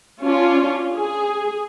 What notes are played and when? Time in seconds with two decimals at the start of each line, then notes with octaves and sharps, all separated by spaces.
0.22 C#4 D4 F4
0.94 G#4